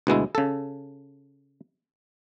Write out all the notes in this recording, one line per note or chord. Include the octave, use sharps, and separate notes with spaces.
D2 B2 G#3 E4
C#3 A4